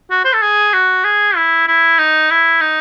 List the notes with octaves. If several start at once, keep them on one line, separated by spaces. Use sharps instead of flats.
F#4
C5
A4
G#4
F#4
G#4
E4
E4
D#4
E4
D#4